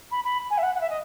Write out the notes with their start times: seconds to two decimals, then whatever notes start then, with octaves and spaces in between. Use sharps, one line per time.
0.11 B5
0.23 B5
0.50 G#5
0.57 E5
0.62 F#5
0.74 F#5
0.80 E5
0.89 D#5